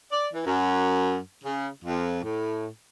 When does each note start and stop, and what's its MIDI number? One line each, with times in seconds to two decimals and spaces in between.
0.12 0.28 74
0.33 0.43 52
0.46 1.17 42
1.44 1.69 49
1.85 2.19 41
2.24 2.67 45